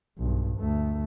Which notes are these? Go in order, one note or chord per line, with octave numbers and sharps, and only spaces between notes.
B1 G2
D2 A3